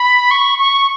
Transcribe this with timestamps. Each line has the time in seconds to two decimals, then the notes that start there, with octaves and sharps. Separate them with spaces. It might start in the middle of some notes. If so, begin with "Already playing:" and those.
Already playing: B5
0.31 C#6
0.58 C#6